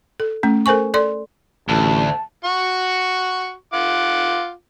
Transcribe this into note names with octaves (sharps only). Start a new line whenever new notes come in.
A4
A3 C#4
A4 A#4 C5 G#5 C#6
A4 D5 C6
A1 D2 A5
F#4 C#6
F4 F#5 D6